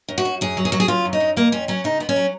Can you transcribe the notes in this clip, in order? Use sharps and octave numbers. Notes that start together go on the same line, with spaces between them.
F#2
F#4
F#2
F#2 G#4
F#3
G#4
F#3 F#4
G#4
C#3 F4
F#2
D#4
F#2
F2 A#3
F2 C#4
F#3 C#4
C#3 D#4
F2 B3
C#4
F#3